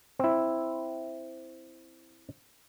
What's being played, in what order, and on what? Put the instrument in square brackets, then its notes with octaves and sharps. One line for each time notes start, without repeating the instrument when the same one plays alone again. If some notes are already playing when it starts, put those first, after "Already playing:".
[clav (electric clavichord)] C4 E4